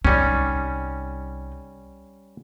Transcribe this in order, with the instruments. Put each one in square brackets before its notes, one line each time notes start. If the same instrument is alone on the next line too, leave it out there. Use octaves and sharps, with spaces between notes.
[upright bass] C2 D#4 [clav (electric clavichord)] G3 C#4